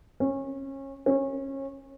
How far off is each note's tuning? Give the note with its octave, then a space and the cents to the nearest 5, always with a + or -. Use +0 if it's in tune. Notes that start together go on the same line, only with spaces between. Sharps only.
C#4 -25
C#4 -25